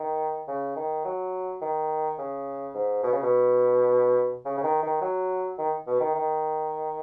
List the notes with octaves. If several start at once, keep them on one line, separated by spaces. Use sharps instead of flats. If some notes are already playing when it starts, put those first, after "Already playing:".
Already playing: D#3
C#3
D#3
F#3
D#3
C#3
G#2
B2
C#3
B2
C#3
C#3
D#3
D#3
F#3
D#3
B2
D#3
D#3